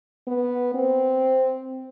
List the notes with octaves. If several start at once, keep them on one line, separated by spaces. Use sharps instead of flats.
B3
C4